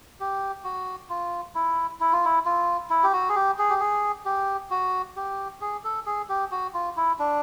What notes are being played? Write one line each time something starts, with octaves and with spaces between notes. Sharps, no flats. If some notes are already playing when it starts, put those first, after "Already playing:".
G4
F#4
F4
E4
E4
F4
E4
F4
E4
G4
F#4
G#4
G4
G#4
G4
G#4
G4
F#4
G4
G#4
A4
G#4
G4
F#4
F4
E4
D4